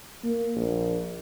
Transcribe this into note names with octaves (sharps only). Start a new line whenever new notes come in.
A#3
A#1